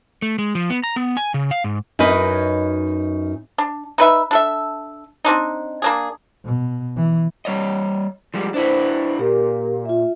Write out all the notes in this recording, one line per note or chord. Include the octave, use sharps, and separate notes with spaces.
A3
G#3
F3
B3
A#5
B3
G#5
C#3
F5
G#2
F#2 D#4 F#4 B4 D#5
D4
D#4 B4 E5
D4 A4 E5
C4 D4 D#4
A#3 D4 G#4
B2
E3
G3 C#5 D#5
F3 G3 G#3
D4 E4 B4 C5
A#2 G4 A#4
F4 E5